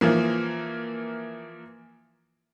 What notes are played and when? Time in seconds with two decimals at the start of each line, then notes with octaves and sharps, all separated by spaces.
0.01 E3 F3 A#3